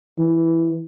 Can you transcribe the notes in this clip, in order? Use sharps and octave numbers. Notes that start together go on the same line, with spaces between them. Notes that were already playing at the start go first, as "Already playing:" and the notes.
E3